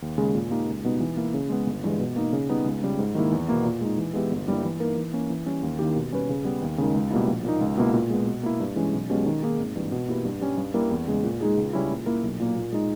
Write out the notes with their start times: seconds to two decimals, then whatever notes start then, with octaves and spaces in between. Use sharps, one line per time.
0.02 D#2
0.18 C#3 G#3
0.34 A#2
0.51 A#3 D#4 G4
0.67 C#2
0.84 B2 G3 B3 D#4
1.00 E3
1.17 A#3 E4
1.34 C#3
1.49 G#3 B3
1.66 G1
1.84 G2 E3 G#3
1.99 B2
2.16 A#3 D#4
2.33 C#3
2.49 G3 B3 D#4
2.65 C#2
2.83 C#3 G3
2.99 G#2
3.15 D#3 G3 A#3 E4
3.32 E2
3.48 B2 A#3 E4
3.65 A#2
3.81 G#3 D#4
3.98 E3
4.14 G#3 B3 E4 G4
4.31 G1
4.47 G2 G3 A#3 E4
4.64 E3
4.80 A#3 D#4 A#4
4.96 E3
5.13 A#3 C#4
5.30 E3
5.46 G3 C#4
5.63 D#2
5.79 D#3 A#3 E4 G4
5.96 B2
6.13 G3 C#4 G4 B4
6.29 C#3
6.45 G3 B3
6.62 D#2
6.78 C#3 G#3 D#4 A#4
6.94 C#2
7.11 B2 G3 A#3 E4
7.27 A#1
7.45 A#2 A#3 D#4
7.61 C#2
7.77 B2 A#3 E4
7.94 A#2
8.10 G#3 B3
8.27 B2
8.43 A#3 E4
8.60 G2
8.76 E3 G#3 C#4
8.93 B1
9.10 B2 G#3 C#4 G4
9.26 D#3
9.43 A#3 D#4 G#4
9.58 G#1
9.75 G2 E3 G3
9.92 B2
10.09 A#3 E4 G4 B4
10.25 G2
10.41 G3 C#4
10.58 G2
10.74 G3 A#3 E4 A#4
10.91 E2
11.08 C#3 G#3
11.24 A#2
11.41 G#3 D#4 G#4
11.57 C#2
11.73 C#3 G3 C#4 E4
11.90 A#2
12.06 A#3 E4 A#4
12.23 B1
12.40 A#2 A#3
12.56 A#2
12.73 G#3 D#4